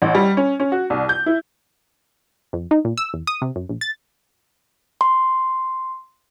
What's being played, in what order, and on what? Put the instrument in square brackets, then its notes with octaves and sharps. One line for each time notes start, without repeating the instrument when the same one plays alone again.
[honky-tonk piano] A1
G3
C#4
C#4
F#4
C2
G6
E4
[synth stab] F2
D#4
A#2
E6
E2
D#6
C3
F#2
A#1
A6
[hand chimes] C6